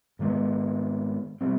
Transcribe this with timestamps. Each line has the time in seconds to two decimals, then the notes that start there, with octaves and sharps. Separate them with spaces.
0.19 G#2 D#3 G#3 B3
1.41 B2 G3 C4